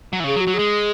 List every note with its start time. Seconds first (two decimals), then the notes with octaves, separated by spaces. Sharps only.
0.13 F#3
0.20 E3
0.24 C#3 G#4
0.36 F#3
0.41 F#4
0.47 F#3
0.54 G#3 G#4